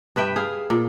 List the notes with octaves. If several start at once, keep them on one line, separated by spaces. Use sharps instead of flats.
G2 B4 E5 G5
G#4 F5
A#2